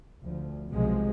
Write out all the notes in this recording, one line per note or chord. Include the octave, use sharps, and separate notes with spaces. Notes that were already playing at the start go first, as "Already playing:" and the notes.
D2 F3
B1 C3 F3 G#3